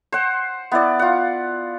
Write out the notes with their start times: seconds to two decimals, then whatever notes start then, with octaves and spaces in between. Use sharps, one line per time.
0.12 C5 F#5
0.72 B3 E4 D5
0.99 F4 F#5